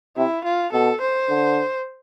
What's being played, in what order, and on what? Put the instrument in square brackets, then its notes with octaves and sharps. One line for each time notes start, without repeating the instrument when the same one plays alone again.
[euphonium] C3 [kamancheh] E4
[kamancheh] F4
[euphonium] B2 [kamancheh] A4
[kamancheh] C5
[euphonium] D3